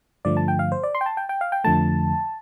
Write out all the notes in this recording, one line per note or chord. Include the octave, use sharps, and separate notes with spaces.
G2 D3 F3 A3 D5
A5
G5
F5
C5
D5
C6
G5
A5
G5
G5
F5
G5
F2 D3 F3 A3 A5